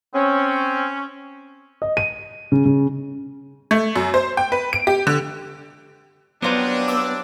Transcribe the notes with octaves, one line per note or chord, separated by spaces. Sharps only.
C4 C#4
D#5
D#7
C#3
C#3
A3
F#2
C5
G5
B4
D7
G4
D3
F#3 G3 B3 C4 D4 F4 C5
D6 E6